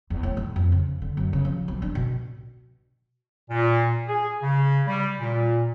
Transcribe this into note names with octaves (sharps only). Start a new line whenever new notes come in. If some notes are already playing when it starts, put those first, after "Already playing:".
E2
A2
E3
F2
C#3
D3
F#2
C#3
F3
B1
D4
B2
A#2
G#4
C#3
G3
A#2